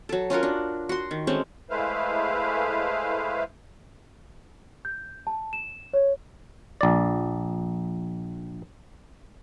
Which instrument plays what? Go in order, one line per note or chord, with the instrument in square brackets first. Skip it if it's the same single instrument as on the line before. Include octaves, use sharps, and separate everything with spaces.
[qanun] F#3 A4
C#4 F4 F#4 A#4
D4
F#4 C6
D#3
G#3 A3 C4 C#4
[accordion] G#3 A3 E4 B4 C5 F5
[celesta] G6
A5
E7
C#5
[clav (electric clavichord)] A#1 D5